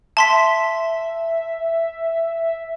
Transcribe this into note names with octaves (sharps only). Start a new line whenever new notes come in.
E5 A5 C6 B6